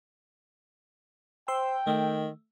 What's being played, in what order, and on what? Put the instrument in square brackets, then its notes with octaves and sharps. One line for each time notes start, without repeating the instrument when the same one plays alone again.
[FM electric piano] C5 C6 E6 [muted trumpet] G5
[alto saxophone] D#3 [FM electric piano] A3